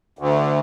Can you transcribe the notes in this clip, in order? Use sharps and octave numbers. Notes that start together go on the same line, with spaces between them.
D2